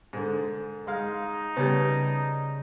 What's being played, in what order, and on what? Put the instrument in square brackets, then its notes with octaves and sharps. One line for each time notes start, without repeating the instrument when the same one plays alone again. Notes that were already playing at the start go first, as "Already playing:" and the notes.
[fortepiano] G#2 D3
[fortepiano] G#3 F5 [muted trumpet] D#4
[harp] C#3 D5 A5 [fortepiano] G3 B3